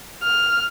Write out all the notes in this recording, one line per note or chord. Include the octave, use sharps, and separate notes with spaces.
F6